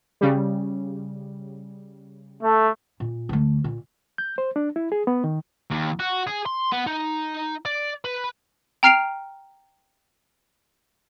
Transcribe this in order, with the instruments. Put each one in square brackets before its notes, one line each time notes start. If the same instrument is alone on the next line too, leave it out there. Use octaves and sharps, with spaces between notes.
[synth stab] C#3 G3
[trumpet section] A3
[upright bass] A#2
D2 A3
A#2
[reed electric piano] G6
C5
D4
E4
G#4
B3
D#3
[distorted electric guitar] D#2
F#4
G#4
C6
B3
D#4
D5
B4
[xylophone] G5 A#5 F6 C7 D7 F7